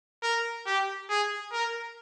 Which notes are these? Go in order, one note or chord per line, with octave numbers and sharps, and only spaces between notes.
A#4
G4
G#4
A#4